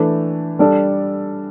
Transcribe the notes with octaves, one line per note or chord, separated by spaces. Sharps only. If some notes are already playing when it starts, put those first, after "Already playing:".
Already playing: E3 A3 D4
G3 D4 A4 D5